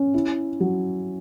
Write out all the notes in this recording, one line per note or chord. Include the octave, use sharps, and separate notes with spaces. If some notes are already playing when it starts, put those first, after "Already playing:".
Already playing: C#4
E4
F#3